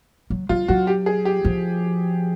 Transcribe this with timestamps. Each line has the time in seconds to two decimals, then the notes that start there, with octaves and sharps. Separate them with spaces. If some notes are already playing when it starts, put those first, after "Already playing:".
0.30 F#3
0.49 F#3 F4
0.68 F#3 F#4
0.87 G4
1.06 G#4
1.25 G4
1.45 F3